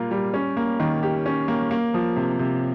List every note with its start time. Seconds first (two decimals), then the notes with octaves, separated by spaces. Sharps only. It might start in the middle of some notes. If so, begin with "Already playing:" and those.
Already playing: A#2 G3 A#3 F4
0.11 G3
0.34 C#4
0.57 A#3
0.80 D#3
1.03 G4
1.26 C#4
1.48 A#3
1.71 A#3
1.94 F3
2.16 C3
2.39 C3